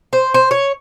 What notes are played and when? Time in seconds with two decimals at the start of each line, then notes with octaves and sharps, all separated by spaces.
0.13 C5
0.34 C5
0.51 C#5